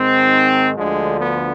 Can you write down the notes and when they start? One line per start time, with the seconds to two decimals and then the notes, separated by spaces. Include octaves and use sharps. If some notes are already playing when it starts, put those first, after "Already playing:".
Already playing: G#2 D#3 C4
0.78 D2 D3 F3 G#3
1.21 B3